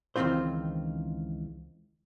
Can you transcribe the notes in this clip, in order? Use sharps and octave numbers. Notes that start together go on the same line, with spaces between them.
C#2 D#3 E3 C4 F4 C5